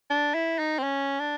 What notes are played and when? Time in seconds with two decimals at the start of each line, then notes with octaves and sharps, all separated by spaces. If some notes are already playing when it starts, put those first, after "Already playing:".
0.10 D4
0.34 E4
0.59 D#4
0.79 C4
0.83 C#4
1.20 D4